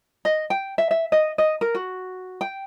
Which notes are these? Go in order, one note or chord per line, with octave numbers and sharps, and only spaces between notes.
D#5
G5
E5
E5
D#5
D#5
A#4
F#4
G5